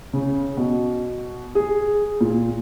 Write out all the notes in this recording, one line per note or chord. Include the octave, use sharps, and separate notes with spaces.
C#3
B2
G#4
A#2